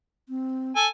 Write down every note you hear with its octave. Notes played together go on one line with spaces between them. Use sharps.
C4
A4 G#5